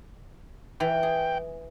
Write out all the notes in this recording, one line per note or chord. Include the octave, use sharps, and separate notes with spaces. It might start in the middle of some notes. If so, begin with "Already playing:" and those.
E3 G5
G#4